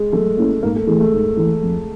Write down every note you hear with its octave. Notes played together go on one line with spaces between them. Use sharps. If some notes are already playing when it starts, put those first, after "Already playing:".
Already playing: G#3
F#3 A3
A#3 C#4 E4
G#2 A#3
A3
E3 G#3 A3
A3
G#2
E3 A3
F2